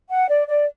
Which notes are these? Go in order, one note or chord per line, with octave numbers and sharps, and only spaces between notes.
F#5
D5
D5